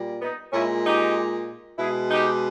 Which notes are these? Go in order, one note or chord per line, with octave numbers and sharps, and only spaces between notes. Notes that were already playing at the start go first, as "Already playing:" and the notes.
Already playing: A#2 G3
B3 D#4
A#2 G#3 C#4 E4
D#4 G4
B2 G#3 E4 G#4
D#4 G4